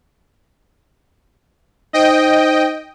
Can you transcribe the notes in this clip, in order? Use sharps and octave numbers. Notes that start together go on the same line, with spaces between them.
D#4 C5 D#5 G5